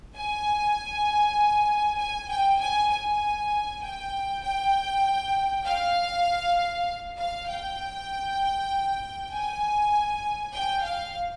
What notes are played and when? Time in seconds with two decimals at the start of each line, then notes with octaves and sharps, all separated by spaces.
0.16 G#5
1.99 G#5
2.30 G5
2.60 G#5
2.91 G#5
3.82 G5
4.43 G5
5.65 F5
7.18 F5
7.49 G5
9.32 G#5
10.54 G5
10.84 F5